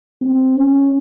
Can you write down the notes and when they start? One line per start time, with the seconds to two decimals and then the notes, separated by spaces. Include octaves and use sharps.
0.21 C4
0.57 C#4